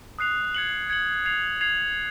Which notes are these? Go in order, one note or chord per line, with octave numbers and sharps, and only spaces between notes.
D#6 F#6 C7 F7
G#6 C#7 F#7
G#6 C#7 F#7
G#6 C7 F7
G#6 C7 F7